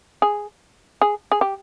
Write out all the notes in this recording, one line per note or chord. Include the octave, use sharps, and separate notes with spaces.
G#4
G#4
G#4
G4